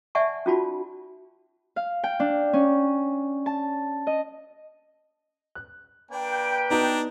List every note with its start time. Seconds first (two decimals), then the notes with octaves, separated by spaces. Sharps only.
0.15 D5 E5 F#5 G#5 A5 C#6
0.46 C#4 D#4 F4 F#4 A5 B5
1.76 F5
2.04 G5
2.20 D4
2.53 C#4
3.46 A5
4.07 D#5
5.55 F#6
6.11 A#3 D4 B4 G5
6.70 B3 D4 D#4 F#4 A#5